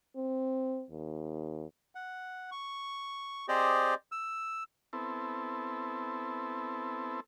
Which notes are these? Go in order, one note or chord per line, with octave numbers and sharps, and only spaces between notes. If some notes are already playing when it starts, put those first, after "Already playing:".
C4
D#2
F#5
C#6
C4 G4 G#4 C5 D5 D#5
E6
B3 C4 E4 A4